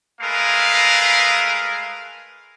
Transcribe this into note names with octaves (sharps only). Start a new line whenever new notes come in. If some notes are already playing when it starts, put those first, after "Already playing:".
G#3 A3 G#4 A#4 B4 F5